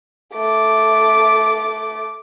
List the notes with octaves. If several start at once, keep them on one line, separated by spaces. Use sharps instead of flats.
A3 D6